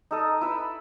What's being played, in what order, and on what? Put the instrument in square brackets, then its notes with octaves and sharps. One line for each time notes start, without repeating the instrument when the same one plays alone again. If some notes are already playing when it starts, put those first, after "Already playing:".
[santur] D#4 A4 D#5
E4 B4 E5